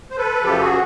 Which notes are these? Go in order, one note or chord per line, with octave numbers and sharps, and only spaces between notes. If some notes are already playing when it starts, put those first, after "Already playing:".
C5
A4 B4
F#2 C#3 F3 G4 A4
F#4 G#4